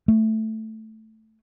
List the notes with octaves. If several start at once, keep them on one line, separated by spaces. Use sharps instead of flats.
A3